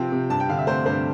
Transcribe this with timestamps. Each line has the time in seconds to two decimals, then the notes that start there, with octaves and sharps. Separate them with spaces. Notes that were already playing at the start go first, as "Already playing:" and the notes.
Already playing: C3 F3 C4 G5
0.12 C3
0.30 G2 A5
0.40 G5
0.49 D3 F5
0.59 E5
0.67 A3 C5
0.86 G2 C5